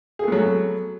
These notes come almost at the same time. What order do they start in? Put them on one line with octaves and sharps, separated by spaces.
G#4 A3 B3 F#3